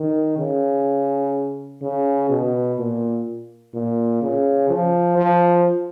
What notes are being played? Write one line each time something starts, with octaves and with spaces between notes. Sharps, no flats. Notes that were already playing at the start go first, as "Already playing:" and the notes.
Already playing: D#3
C#3
C#3
B2
A#2
A#2
C#3
F3
F3